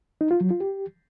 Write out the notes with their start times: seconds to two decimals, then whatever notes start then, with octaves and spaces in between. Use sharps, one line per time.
0.21 D#4
0.31 F4
0.41 F#3
0.51 F4
0.60 G4